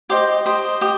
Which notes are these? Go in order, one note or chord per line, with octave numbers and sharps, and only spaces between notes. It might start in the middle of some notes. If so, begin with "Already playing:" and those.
G4 C5 D#5 D6
G4 C5 D#5
G4 D#6